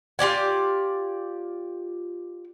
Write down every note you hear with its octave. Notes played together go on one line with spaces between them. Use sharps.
F4 G4 D5 G#5